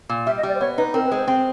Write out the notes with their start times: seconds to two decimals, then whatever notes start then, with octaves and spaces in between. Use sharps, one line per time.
0.09 A#2
0.26 G3 E5
0.37 D#5
0.43 G3
0.49 D5
0.55 C5
0.60 B3 C#5
0.78 D#4 B4
0.94 C4 A#4
1.06 B4
1.12 G#3 C5
1.28 C4